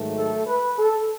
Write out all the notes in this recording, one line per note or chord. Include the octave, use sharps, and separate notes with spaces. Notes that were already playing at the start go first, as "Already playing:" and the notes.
Already playing: G#2 D#3 F#3 A3
A4
B4
A4